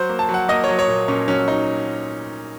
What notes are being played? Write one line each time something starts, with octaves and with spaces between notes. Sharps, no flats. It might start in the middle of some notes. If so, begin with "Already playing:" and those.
Already playing: F#3 C5
A#3
A5
F#3
F#5
A#3 D#5
C#5
F#3
C#5
A#2
A#2 C#4
F#3 C#4
F#3 D#4